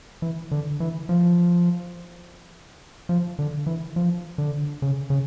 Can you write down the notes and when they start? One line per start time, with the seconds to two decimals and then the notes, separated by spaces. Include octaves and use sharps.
0.22 E3
0.51 D3
0.80 E3
1.09 F3
3.09 F3
3.39 D3
3.66 E3
3.96 F3
4.38 D3
4.82 C#3
5.10 C#3